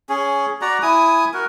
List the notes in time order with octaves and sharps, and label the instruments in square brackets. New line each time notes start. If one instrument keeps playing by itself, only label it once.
[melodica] C#4 G#4
F#4 D5 A#5
E4 G#5 D#6
F#4 A#4